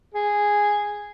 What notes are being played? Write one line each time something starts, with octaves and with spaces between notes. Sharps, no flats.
G#4